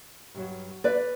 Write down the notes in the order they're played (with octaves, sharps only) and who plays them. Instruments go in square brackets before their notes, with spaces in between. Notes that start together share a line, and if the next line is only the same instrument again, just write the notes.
[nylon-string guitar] G2 F#3
B4 D5